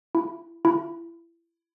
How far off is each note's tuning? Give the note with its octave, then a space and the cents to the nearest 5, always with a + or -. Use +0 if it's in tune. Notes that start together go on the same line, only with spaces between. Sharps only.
E4 +25
E4 +30